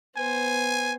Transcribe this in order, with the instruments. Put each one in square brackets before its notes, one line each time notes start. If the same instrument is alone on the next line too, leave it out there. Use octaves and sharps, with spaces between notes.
[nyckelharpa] B3 C5 [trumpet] G#5